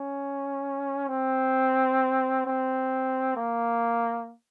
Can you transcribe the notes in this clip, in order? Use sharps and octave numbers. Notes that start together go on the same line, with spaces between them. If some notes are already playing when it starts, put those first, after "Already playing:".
Already playing: C#4
C4
C4
A#3